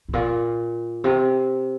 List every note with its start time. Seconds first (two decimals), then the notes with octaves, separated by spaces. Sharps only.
0.09 G#2
0.13 A#2
1.04 C3